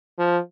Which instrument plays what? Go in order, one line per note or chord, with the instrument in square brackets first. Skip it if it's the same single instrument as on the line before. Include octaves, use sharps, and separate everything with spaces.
[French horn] F3